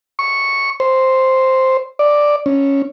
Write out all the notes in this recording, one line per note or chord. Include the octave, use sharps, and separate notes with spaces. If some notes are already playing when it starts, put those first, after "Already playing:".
C#6
C5
D5
C#4